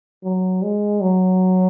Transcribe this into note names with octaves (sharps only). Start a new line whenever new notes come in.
F#3
G#3
F#3